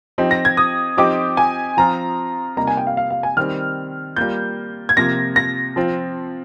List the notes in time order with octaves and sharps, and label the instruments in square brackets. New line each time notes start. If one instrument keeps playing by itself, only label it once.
[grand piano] F3 C4 D#4 G4
[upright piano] A#6
G#6
D#6
[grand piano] F3 C4 D#4 G4 [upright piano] D6
[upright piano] G#5
[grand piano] F3 C4 F4 [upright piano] A#5
[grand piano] C3 G3 A#3 D#4 [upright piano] A#5
[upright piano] G#5
G5
F5
F5
F5
G#5
[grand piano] D#3 G3 C4 [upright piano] F6
[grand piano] G3 A#3 F4 [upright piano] G6
[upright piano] G#6
[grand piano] C3 F3 A#3 [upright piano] A#6
[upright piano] A#6
[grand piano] F3 C4 F4